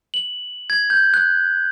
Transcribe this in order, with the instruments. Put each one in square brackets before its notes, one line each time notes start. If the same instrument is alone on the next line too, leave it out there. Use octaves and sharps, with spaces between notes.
[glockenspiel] F#7
G#6
G6
F#6